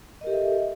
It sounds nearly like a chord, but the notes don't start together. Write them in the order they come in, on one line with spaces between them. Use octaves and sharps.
D#5 A#4 G4 A4 E5